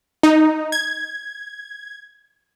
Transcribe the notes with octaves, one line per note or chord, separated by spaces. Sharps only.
D#4
G#6